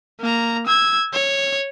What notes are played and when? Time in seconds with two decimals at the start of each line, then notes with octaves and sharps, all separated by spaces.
0.20 A#3 A#5
0.66 E6 G#6
1.13 C#5